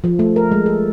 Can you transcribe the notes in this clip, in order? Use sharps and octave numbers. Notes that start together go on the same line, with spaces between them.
F3
A3
A#4
G#3
A4